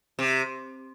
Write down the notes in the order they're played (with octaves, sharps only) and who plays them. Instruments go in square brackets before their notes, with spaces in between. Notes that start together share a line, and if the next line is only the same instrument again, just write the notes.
[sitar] C3